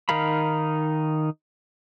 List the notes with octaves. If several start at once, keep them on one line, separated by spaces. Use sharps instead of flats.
D#3 D#4 A#4 F5 B5